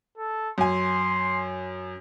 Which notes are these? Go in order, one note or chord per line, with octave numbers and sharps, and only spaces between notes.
A4
F#2 G#5 C6